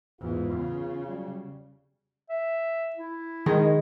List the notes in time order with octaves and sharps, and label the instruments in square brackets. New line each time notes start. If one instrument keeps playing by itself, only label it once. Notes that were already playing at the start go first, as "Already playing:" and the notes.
[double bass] E2 G#2 [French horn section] F4
[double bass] C#3
[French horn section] F#3 G3
[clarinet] E5
E4
[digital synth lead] D#3 [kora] G#3